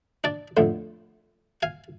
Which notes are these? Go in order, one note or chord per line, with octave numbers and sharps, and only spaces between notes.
D4 D5
F2 A2 D3
F5 G#5